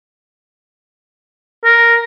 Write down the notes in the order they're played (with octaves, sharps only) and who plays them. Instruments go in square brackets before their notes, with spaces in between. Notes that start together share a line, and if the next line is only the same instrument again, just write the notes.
[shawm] A#4